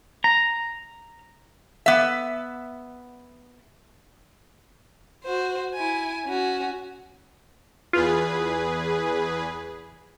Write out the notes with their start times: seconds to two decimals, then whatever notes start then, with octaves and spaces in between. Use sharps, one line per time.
0.24 A#5
1.86 B3 E5
5.24 F#4 C5
5.74 E4 G#5
6.26 C#4 F#4
7.93 E2 F4 G#4 B4